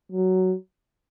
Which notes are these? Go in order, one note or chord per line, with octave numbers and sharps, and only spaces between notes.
F#3